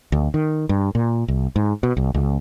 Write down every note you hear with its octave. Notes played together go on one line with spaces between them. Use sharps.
D2
D#3
G2
A#2
C2
G#2
B2
C2
C#2